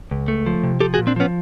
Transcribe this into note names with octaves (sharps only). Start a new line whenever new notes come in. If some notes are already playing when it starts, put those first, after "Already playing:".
C#2
A3
F3
C3
F3 G4 A4
F#4 G#4
A#2
C4 D4
F3 B3 C#4